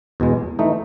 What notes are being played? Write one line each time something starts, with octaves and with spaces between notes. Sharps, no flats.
E2 B2 G#3
E3 A3 D#4